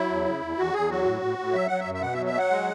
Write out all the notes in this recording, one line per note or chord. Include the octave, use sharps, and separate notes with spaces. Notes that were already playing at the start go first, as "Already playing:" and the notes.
Already playing: F#3 E4
E2
C#3
E2
E2 F#4
E2 G#4
F#3 F#4
A2
A2
A2
F#3 E5
F#3 F#5
E5
F#2
E5
B2 F#5
E5
F#3
E5
F#3 F#5
G#3